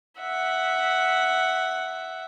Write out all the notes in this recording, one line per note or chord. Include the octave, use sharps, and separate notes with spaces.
E5 F#5